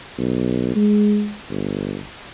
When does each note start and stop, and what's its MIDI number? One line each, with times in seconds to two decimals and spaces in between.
0.18 0.72 35
0.75 1.33 56
1.50 2.00 31